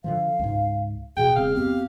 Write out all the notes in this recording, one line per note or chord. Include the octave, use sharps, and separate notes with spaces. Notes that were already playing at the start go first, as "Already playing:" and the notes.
D3 E3 F3 F5
C#2 G#2
E2 B2 G#4 G5
E1 C#3 C4 F5
F2 B3 C4 G4